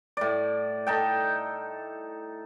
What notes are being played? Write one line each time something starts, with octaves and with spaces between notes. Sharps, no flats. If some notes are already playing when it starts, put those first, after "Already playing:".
A2 D5
D#4 A4 G5